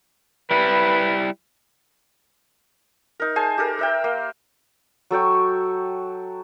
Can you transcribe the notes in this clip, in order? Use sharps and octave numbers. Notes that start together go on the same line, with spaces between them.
G3 E4 B4
D#4 A#4
G#4 C5 G#5 A5
G4 A4 A#4
A#4 E5 G5
A#3
F#3 A4 G5 C#6